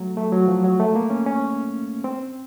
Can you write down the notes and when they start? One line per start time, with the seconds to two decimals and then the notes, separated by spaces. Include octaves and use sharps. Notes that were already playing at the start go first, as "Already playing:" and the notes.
Already playing: F#3 A3
0.17 A3
0.32 F#3
0.48 F3
0.64 F#3
0.80 A3
0.95 A#3
1.10 C#4
1.26 C#4
2.04 C4